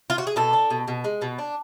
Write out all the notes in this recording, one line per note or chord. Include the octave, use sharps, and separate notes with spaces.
F4
F#4
G#4
B2 A4
D4
B2
B2
G#3
B2
D4